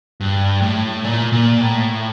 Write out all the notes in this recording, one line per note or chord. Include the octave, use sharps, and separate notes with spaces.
G2
A2
A#2
A#2
A2